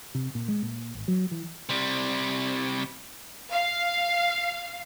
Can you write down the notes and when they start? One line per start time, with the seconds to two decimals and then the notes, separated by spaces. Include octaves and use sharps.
0.15 C3
0.35 A#2
0.48 G#3
0.62 A#2
0.95 G#1
1.08 F#3
1.31 E3
1.69 C3 G3
3.51 F5